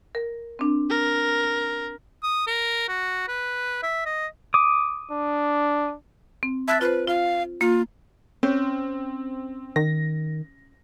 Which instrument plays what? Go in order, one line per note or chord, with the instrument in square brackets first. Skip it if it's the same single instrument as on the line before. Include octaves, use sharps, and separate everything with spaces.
[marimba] A#4
C4 D4
[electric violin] A#4
[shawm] D#6
A#4
F#4
B4
E5
D#5
[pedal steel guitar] D6 D#6
[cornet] D4
[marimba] C4
[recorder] E5 [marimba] A5 F#6 A6
[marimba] F4 C5 [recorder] B4
[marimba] F4 [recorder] F5
[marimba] A#3 [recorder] F4
[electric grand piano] C4 [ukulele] C#4 C5
[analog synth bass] D#3 [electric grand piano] A#6